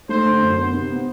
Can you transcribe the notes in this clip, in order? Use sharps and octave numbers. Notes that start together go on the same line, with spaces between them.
A3 C5
D3
F#2
B3 C5
C3
B3